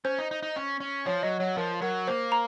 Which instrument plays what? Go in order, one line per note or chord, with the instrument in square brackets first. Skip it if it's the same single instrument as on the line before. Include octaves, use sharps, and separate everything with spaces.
[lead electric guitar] C#4 [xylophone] C5
[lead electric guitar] D#4
D#4
D#4
C#4
C#4
[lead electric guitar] F3 [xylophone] C#5
[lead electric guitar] F#3 [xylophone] D#5
[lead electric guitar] F#3 [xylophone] C#5
[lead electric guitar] F3 [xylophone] A#4
[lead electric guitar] F#3 [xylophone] A#4
[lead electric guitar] A#3 [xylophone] C5
[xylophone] A#5